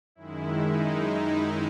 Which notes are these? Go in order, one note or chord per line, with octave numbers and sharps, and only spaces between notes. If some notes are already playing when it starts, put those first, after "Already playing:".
F#2 D#3 G#3 E4
D#4